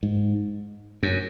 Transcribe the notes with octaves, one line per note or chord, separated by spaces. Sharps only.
G#2
F#2